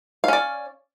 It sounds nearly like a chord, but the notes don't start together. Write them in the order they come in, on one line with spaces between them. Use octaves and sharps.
F5 C#4 D5